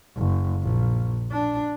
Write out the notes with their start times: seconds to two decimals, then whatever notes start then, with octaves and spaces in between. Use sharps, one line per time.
0.17 F#1
0.62 A#1
1.32 D4